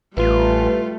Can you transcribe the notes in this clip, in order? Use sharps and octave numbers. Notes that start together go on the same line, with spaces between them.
A1 G3 A3 F4 B4